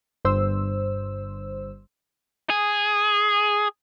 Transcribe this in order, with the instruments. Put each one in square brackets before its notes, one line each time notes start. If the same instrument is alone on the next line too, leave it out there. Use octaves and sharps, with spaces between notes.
[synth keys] G1 G2 C5 E6
[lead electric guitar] G#4